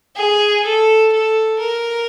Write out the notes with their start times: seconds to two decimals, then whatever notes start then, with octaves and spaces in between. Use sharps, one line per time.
0.16 G#4
0.64 A4
1.12 A4
1.59 A#4